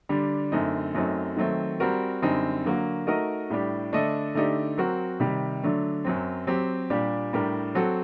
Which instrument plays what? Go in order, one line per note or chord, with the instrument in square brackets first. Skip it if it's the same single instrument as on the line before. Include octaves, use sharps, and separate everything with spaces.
[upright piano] D3 G3 D4
F#2 D3 A3 C4 D#4
F#2 F#3 A3 C4 D#4
D#3 F#3 A3 C4
G3 C4 F#4 A#4
F#2 D3 G3 C4 D#4
D3 F#3 A#3 F#4
A3 D#4 F#4 A#4 D#5
A2 G3 D4 G4
D3 A3 D4 A4 D#5
D3 A3 D#4 G4 D5
F#3 C4 F#4 A#4
C3 D#3 G3
D3 F#3 A3 D4
F#2 F#3 C4
F#3 C4 G4
A#2 G3 D4 G4
A2 G3 D4 G4 A#4
F#3 C4 F#4 A4